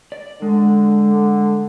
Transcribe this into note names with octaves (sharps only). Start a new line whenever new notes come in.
D5
D3 G#3